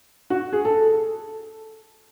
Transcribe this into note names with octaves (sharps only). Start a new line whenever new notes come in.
F#4
G#4
A4